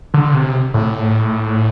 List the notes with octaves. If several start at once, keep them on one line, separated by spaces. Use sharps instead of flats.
D3
C3
A2